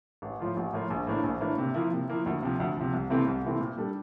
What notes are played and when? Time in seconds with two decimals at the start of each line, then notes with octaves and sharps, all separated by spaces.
0.22 A1
0.40 A2 F3 A#3 F4
0.57 A1
0.73 A2 F3 A#3 F4
0.90 A#1
1.07 A2 E3 A#3 D4
1.24 A#1
1.41 A2 E3 A#3 D4
1.58 C3
1.74 F3 A#3 E4
1.92 C3
2.09 F3 A#3 E4
2.26 D2
2.42 C3 F3
2.60 D2
2.77 C3 F3
2.93 C2
3.10 C3 E3 A3 C4
3.27 C2
3.44 C3 E3 A3 C4
3.61 A#2
3.78 G3 D4 A4